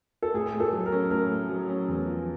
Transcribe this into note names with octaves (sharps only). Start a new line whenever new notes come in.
A4
A2 G#4
A3
A4
F#3
A#4
C#4
A2 A#4
A3
F#3
C#4
E2
F3